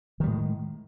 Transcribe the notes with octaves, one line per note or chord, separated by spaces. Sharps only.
A2 D#3 G3 G#3